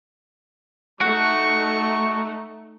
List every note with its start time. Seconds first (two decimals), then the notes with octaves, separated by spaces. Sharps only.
1.01 A3 D#4 F#4 C#6